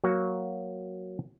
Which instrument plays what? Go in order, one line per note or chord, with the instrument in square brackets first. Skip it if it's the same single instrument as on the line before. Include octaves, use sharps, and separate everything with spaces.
[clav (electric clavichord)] F#3 A#3 F#4